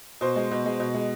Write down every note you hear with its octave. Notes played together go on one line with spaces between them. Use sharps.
B2 C5
G#3
B2
G#3
B2
G#3